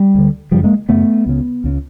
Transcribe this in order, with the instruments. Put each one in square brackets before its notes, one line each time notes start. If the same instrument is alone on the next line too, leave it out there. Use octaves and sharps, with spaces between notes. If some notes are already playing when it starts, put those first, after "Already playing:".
Already playing: [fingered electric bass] G3
D2 D3
F#2 C#3 F3 G3
G#3 A#3
F#2 C#3 A3 B3
C#2 C#3
C#2 C#3